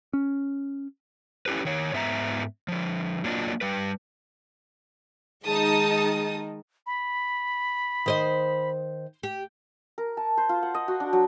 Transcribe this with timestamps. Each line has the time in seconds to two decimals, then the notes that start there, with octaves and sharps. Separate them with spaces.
0.13 C#4
1.46 C#4 E4 G4 B4
1.65 D#3 C#5
1.94 G#2 B3 E5 A5 A#5
2.68 D3 F3
3.24 F#3 A#3 D4 F4 D#5
3.61 G3 B4
5.46 D#3 G#3 D#4 G#4 A5 D#6
6.86 B5
8.06 D#3 C5 D#5
9.23 G4
9.98 A#4
10.17 A5
10.38 C5
10.49 F4
10.63 F#5
10.74 D#5
10.88 F#4
11.00 D4
11.13 F#3